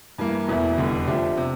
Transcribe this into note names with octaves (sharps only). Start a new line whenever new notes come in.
G2 E3 A#3
E1 E2 E3 A3 E4
F1 E2 D3 G3
D3 F3 A3 D4 G4
C3